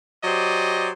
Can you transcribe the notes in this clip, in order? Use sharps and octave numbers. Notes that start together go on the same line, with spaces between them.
F#3 G4 C5 D5 D#5